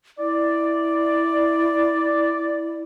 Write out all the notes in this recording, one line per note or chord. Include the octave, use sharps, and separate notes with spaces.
E4 D5